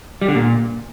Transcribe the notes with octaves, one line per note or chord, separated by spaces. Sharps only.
G3
D3
A#2